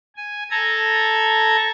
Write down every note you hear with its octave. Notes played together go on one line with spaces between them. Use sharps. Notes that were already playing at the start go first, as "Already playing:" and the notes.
G#5
A4 A#5 G#6